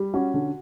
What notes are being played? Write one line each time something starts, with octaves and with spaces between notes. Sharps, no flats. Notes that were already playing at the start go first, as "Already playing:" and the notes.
Already playing: G3
C#4 F#4
D3